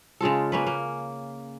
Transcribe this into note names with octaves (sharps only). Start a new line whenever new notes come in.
C#3 G#3 F4 A4
A#3 C#4 B4
A#3